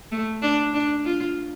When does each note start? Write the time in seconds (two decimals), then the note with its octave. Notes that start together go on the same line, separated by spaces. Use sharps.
0.12 A3
0.42 D4
0.74 D4
1.05 F4